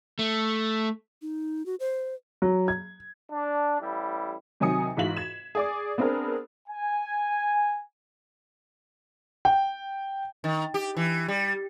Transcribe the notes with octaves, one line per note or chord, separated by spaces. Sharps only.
A3
D#4
F#4
C5
F#3
G#6
D4
A1 G3 E4
C3 D#3 F#3 G#5 D#6 C#7
G#2 E3 F4 F#4 B6 F#7
G#6 E7
G#4 D5 D6
B3 C4 D4 G#4 A#4
G#5
G5
D#3
G4
E3
G3